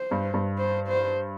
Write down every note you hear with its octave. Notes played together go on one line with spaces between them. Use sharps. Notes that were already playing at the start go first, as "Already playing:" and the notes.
Already playing: C5
G2
G2
C5
C5